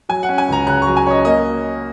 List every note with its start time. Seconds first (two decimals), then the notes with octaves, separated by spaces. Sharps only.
0.09 F#3 G#5
0.23 F#5
0.29 C#4
0.38 G#5
0.48 C#2 A#5
0.67 C#3 F#6
0.82 F#3 C#6
0.97 G#5
1.07 C#4 C#5
1.10 D#5
1.25 A#3 D#5